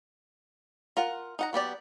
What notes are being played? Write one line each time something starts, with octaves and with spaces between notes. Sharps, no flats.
F4 A#4 F#5
D#4 F#5 A#5
F#3 B3 G4 D5